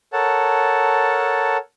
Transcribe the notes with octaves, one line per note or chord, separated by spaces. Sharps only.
A4 A#4 C#5 F#5 A5